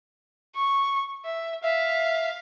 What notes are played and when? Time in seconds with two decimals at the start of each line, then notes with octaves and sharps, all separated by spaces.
0.55 C#6
1.25 E5
1.63 E5 F5